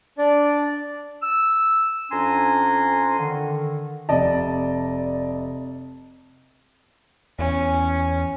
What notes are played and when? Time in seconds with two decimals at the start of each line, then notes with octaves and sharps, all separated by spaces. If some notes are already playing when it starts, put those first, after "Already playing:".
0.18 D4 D5
1.22 E6
2.11 F2 C#4 D4 G#5 A#5 C6
3.18 D3 D#3
4.09 F1 D5 D#5 A5
7.39 E2 C#4